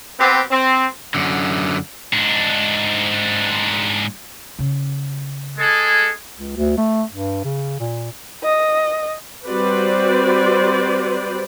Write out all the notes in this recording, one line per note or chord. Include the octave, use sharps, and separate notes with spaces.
B3 C4 G4
C4
F#2 D3
G#2 D4
C#3
G#3 G#4 A4
C#2
D2
A3
G2
C#3
A#2
D#5
G3 C4 F#4 B4 C5 D5